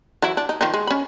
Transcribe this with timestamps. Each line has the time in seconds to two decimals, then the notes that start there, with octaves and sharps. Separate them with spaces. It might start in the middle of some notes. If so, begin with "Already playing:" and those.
0.22 E3 F#3 E4
0.37 D4
0.49 D#4
0.61 D#3 F3 D#4
0.74 G#3
0.87 C#4 B5